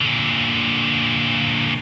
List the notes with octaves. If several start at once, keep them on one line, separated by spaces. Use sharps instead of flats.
A#2 D3